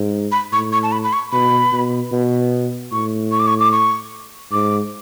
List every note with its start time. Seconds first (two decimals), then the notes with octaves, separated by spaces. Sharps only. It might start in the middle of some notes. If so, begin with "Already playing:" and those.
Already playing: G#2
0.32 B5
0.52 A2 C#6
0.73 C#6
0.83 A5
0.92 B5
1.03 B5
1.13 C#6
1.32 B2 B5
1.72 B2
2.12 B2
2.91 A2 C#6
3.32 C#6
3.40 D6
3.47 C#6
3.60 D6
3.72 C#6
4.52 G#2 D6